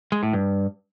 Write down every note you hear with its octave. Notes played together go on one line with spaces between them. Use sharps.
G#3
A2
G2